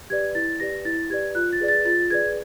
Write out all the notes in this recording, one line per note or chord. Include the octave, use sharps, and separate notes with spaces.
G4 B4 D5 G#6
E4 A6
G4 B4 D5 A#6
E4 A6
G4 B4 D5 G#6
F4 F#6
A6
G#4 B4 D5
A6
F4 A6
G#4 B4 D5 G#6